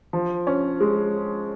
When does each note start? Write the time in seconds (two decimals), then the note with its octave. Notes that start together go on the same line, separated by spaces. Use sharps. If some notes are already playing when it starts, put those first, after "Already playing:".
0.13 F3
0.47 C#4
0.80 G#3